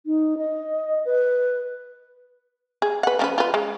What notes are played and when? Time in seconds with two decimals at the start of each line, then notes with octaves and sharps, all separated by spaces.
0.06 D#4
0.38 D#5
1.05 B4
2.82 G#4
3.03 B4 F#5
3.19 F3 C#4 B4
3.38 F4 B4
3.54 G#3